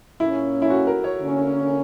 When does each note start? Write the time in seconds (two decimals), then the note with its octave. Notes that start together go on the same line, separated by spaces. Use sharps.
0.20 A#2 A#3 C#4 E4
0.62 E4
0.70 F#4
0.87 A#4
1.04 C#5
1.20 D3 A#3 C#4